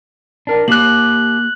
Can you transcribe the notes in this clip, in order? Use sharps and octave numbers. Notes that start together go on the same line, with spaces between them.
D4 A#4
A#3 G4 F#6 F#7